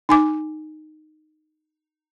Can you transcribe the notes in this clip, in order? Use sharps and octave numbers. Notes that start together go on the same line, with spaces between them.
D#4 G#5 D6